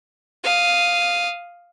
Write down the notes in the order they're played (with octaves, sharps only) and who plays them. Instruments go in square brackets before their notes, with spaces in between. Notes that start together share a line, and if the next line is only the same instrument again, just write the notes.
[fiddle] F5 D#6